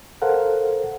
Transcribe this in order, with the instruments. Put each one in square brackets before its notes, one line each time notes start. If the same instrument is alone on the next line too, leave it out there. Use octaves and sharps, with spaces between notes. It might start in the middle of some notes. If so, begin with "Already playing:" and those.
[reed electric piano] A4 A#4 C5 F5 F#5